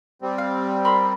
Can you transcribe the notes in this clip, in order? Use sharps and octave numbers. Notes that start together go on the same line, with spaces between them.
G3 C4
F5
A#4 B5 C6